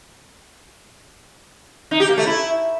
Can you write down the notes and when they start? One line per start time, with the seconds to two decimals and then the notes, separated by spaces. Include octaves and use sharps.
1.91 D#4
2.00 G4
2.09 A#3
2.18 A3
2.26 E4